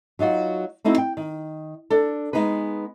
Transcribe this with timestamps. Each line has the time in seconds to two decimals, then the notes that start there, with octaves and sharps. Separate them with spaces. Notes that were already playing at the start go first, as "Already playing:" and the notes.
0.19 F#3 D#4 F4 F#4
0.84 A3 C4 D#4 E4 F#4
0.98 G5
1.17 D#3
1.90 D4 A4
2.33 G#3 B3 D#4 G#4 B4